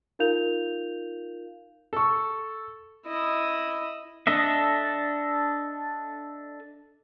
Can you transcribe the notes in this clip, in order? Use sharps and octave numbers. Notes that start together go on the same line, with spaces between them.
D#4 F4 A#4 F5 G6 F7
A4 C#6
E4 D#5
D4 A4 D#5 E5